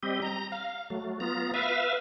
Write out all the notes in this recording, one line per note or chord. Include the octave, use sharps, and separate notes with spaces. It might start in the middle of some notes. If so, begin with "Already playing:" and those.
G3 C4 G4 D#5
A#5
F5
F#3 A3
B3 F4 A#5
B4 E5 F5